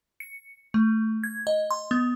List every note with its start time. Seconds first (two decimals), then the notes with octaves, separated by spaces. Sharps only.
0.20 C#7
0.74 A3
1.23 G#6
1.47 D#5
1.71 C6
1.91 B3